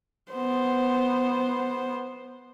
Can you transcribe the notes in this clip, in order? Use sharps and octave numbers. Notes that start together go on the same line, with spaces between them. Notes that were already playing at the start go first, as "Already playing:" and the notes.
B3 C5